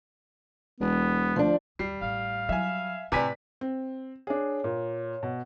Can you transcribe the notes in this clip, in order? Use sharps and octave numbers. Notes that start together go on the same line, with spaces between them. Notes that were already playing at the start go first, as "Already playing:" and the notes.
E1 B3
D2 F3 D4
D#2 G3 C7
A1 F5
F#3 E5 G#5
A2 C3 D#3 B4 D5 G#5 B6
C4
D4 G#4 C#5
A#2
B2